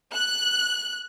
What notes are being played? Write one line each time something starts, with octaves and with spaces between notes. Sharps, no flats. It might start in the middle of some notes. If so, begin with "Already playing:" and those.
F#6